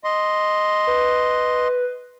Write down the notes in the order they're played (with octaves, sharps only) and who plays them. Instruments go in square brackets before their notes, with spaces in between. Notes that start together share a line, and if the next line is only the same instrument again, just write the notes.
[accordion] D#5 C6
[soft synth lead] B4